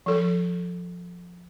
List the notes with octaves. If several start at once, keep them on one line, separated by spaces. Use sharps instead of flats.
F3 A4